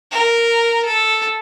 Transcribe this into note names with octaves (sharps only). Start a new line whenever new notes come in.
A#4
A4